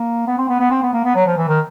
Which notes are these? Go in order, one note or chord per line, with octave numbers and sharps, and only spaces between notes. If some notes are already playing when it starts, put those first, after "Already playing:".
Already playing: A#3
B3
C4
B3
B3
C4
B3
A#3
B3
F#3
F3
E3
D#3